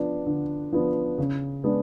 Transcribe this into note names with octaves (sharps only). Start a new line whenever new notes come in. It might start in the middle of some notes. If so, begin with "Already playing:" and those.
Already playing: F3 B3 D4
D3
F3 B3 D4
C#3
G#3 B3 D4